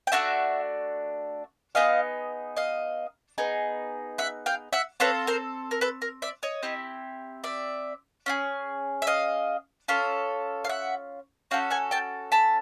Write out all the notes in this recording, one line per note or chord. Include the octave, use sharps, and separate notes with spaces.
G5
A3 D4 F#4 E5 F#5
B3 D#4 G#4 D#5 F5
D#5 F5
B3 D#4 G#4
E5 F#5
F5 G5
E5 F#5
C4 F4 A4 B4 C#5
A#4 C5
A#4
A4 B4
A#4
D5 E5
C#5 D#5
C4 E4 G4
D5 E5
C#4 F4 G#4
E5
D#5 F5
C#4 F4 A4
F5
E5 F#5
C#4 F#4 A4 F5 G5
F#5 G#5
G5 A5
A5 B5